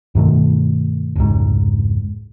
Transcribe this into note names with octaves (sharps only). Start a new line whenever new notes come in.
G2 B2 D#3 A3
F1 C#2 G#2